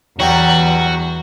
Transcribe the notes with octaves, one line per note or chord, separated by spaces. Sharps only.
E2 F#3 G3 F#4 F#5 G5 A#5